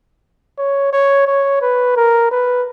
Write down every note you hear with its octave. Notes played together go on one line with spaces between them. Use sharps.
C#5
C#5
C#5
B4
A#4
B4